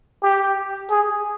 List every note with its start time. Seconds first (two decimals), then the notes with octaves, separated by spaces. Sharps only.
0.22 G4
0.90 G#4